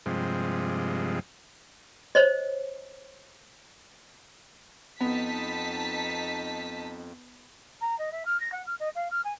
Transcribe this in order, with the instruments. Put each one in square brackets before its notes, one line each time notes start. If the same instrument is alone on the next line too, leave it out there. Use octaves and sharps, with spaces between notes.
[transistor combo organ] G2 C3 F3 G#3
[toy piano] C5 C#5 D#5
[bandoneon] F2 [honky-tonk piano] B3 [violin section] D#4 A5 B6
[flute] A#5
D#5
E5
F6
A#6
F#5
F6
D#5
F5
F6
G#5